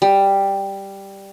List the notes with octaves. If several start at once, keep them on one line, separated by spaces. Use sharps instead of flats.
G3